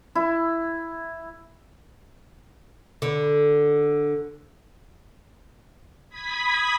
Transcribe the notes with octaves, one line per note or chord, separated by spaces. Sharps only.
E4
D3
B5 D#6 G#6 B6